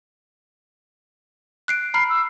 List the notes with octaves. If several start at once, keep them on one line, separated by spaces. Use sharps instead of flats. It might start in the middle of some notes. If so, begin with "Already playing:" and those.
F#6 C7 D7
A#5 B5 F6 C7
E6